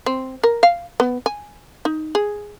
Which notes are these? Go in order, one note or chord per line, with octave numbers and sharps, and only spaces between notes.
C4
A#4
F5
B3
G#5
D#4
G#4